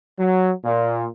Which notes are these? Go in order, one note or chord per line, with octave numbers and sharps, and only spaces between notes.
F#3
A#2